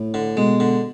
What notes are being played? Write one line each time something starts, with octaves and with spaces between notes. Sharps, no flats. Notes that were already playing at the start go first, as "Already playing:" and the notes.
Already playing: A2
D3
B2 G#3
D3